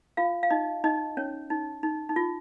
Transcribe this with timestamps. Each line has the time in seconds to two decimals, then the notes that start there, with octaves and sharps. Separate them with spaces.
0.17 F4 F5
0.43 F5
0.50 D#4 D#5
0.84 D#4 D#5
1.17 C#4 C#5
1.50 D#4
1.83 D#4
2.09 D#4
2.16 F4